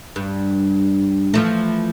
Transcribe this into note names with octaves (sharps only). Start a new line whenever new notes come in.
G2
E3 F3 A3